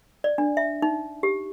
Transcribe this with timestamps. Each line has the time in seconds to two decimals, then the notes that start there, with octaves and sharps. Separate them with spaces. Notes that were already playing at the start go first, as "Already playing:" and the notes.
0.24 D5
0.38 D4
0.57 E5
0.82 D#4
1.23 G4